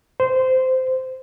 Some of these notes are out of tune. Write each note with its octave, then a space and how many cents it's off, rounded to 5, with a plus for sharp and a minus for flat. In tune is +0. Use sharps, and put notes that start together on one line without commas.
C5 -15